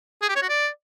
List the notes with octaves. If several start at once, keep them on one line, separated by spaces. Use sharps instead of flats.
G#4
G4
C#5
F#4
D5